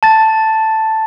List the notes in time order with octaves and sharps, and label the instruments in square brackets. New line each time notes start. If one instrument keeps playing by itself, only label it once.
[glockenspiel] A5 A6